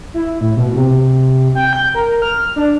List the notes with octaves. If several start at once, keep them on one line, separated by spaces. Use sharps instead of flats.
E4
A2
B2
C3
G5
G6
A#4
F6
D4